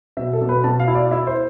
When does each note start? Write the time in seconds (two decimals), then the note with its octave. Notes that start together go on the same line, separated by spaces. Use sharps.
0.17 B2 E5
0.33 A4
0.41 B2
0.49 B4
0.64 B2 A5
0.80 F5
0.88 E4
0.95 D5
1.11 E4 E5
1.27 C5